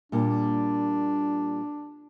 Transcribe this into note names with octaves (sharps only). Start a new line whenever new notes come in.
A#2 G3 A#3 D4